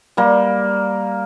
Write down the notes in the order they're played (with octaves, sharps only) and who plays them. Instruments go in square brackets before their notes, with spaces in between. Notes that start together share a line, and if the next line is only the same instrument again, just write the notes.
[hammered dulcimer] G3 A#3